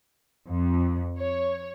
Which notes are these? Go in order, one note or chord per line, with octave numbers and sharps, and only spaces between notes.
F2
C#5